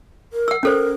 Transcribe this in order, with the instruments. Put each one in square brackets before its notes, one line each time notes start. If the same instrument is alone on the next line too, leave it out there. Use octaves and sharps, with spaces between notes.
[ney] A#4
[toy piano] F#5 E6
[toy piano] C#4 A4 C5 [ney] A#4